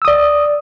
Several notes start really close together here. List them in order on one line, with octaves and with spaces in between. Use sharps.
E6 D#6 D5